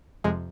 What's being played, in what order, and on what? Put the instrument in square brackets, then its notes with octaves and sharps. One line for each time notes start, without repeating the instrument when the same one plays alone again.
[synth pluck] F2 C3 F3 G#3